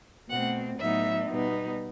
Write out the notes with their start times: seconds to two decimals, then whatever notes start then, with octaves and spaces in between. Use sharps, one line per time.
0.29 B2 A3 C4 F#5
0.79 A2 F#3 B3 D#4 E5
1.29 B2 G3 B3 D#4